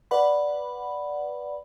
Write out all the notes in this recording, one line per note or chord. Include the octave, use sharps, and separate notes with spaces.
B4 D5 F#5 B5